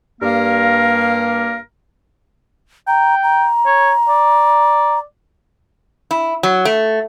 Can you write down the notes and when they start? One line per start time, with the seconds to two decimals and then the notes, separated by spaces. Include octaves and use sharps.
0.22 G2 A#3 A#4 F5
2.88 G5 A#5
3.23 A#5
3.66 C#5
4.09 D5
6.11 E4
6.43 F#3
6.65 A3